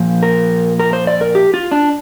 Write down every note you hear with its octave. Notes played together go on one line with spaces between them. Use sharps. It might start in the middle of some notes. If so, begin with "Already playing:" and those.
Already playing: A#2 F3
A#4
A#4
C5
D5
A#4
G4
F4
D4